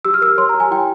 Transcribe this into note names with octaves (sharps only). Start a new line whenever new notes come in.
G4 E6
F6
A#4 E6
C#5 C6
A#5
G4
G#5
E4 G5